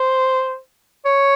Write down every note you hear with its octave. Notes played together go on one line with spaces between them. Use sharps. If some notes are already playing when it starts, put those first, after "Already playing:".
Already playing: C5
C#5